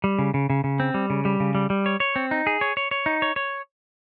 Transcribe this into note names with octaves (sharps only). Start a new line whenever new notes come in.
G3
C#3
C#3
C#3
C#3
C4
G3
C#3
G3
C#3
G3
G3
C#5
C#5
C4
D#4
G#4
C#5
C#5
C#5
D#4
C#5
C#5